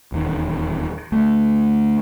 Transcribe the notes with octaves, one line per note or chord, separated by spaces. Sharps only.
D#1 E2 D#3
D2 A3